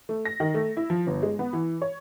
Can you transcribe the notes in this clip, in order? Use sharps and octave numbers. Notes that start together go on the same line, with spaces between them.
A3
A#6
D#3
A3
E4
F3
G1
G#3
B3
E3
C#5